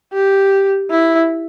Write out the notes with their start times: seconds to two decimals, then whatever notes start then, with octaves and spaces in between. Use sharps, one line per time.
0.13 G4
0.91 E4